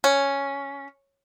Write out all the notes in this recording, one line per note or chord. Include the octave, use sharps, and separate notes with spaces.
C#4